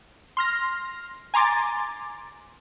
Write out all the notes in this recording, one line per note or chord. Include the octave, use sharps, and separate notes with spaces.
C6 F6 A#6
G#5 A#5 C6 D6 A6